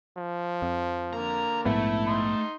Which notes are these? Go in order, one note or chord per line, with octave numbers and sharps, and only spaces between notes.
F3
F2
D3 A#3 A#5
A#1 G#2 A3 B3 E4
D#4 C6